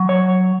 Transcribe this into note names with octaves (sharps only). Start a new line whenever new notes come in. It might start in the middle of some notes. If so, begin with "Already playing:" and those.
Already playing: F#3
C#5